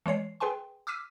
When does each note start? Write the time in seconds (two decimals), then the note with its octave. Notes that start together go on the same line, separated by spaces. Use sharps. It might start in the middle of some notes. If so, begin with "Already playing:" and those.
0.06 E3 G#3 C#5 C7
0.40 G#4 B4 G5 G#5 C6
0.87 D6 E6 F6 B6 D#7